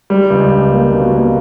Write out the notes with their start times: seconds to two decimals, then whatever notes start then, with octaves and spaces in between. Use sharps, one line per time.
0.10 G3
0.30 C#2
0.51 C#2
0.71 A#3
0.92 B2
1.12 A#3